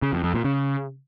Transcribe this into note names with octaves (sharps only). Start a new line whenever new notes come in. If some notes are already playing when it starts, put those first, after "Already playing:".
C#3
F2
F2
A#2
C#3